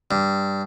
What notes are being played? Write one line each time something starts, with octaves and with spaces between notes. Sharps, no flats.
G2